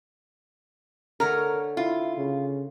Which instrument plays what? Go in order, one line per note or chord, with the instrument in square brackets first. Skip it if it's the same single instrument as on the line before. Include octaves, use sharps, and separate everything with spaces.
[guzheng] D3 A3 C#5 [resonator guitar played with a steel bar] A#4
[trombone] E4 [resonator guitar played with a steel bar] F4
[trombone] C#3